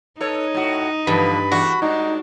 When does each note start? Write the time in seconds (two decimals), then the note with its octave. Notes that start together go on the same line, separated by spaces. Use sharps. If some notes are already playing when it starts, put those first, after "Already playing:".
0.21 D#4 A4 B4 C#5
0.55 A2 F#4
1.07 G2 D3 E3 F3 B5
1.52 E2 A3 D4 F#4
1.82 G#2 D4 D#4